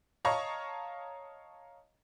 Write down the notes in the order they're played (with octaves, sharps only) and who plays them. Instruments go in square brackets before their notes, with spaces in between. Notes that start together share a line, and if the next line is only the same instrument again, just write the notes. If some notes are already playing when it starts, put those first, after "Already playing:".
[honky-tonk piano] C#5 D#5 F5 A5 A#5 C#6